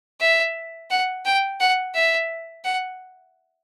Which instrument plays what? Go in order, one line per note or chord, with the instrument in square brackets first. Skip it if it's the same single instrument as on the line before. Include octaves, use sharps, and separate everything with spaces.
[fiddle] E5
F#5
G5
F#5
E5
F#5